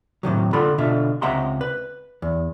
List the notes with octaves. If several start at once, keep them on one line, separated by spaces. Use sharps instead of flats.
A2 C3 D#3 F#3
D3 F4 A4 B5
B2 D3 F4 E5
C#2 C3 E5 F#5 A#5 C6
B4
E2